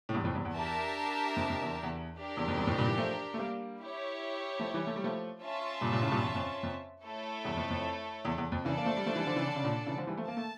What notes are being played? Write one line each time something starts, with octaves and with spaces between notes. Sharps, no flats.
A2
E2 G2
F2 A2
E2 G2
E2
D4 G4 A#4 E5 A5
F2
F2
E2
E2
D4 G4 A#4
E2
F2
E2 G2
F2 A2
G2 A#2
E3 G3
F3 A3
A3
G3 A#3
E4 G4 C#5
F3 A3
E3 G3
A3
G3
F3 A3
C#4 F4 C#5 E5 A5
G2 A#2
G2 A#2
A2 C#3
G2 A#2
E2
F2
F2
A3 E4 A4 C#5
E2 G2
F2
F2
E2
E2
F2
C#3 E3 D4 A4 D5 A5
A#3
F3 A3
G3
F3 A3
E3 G3
D3 F3
C#3 E3
D3
C#3
A#2 D3
C#3 E3
D3 F3
E3 G3
F3 A3
A#3 A5
A3